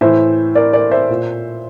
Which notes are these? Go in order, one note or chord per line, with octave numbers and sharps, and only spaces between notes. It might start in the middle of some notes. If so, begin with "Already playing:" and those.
A2 E3 C5 E5
A#4 D5
A#4 D5
C5 E5
A#2